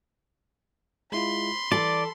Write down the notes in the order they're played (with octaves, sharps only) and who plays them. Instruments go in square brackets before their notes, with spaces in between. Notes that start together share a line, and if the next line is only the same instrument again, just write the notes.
[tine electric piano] G#3 E4 F4 [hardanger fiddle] B5 C6
[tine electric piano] E3 [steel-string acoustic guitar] A4 [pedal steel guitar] D5